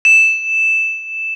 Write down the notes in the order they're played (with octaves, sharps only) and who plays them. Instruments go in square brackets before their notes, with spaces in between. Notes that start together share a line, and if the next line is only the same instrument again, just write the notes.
[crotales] E7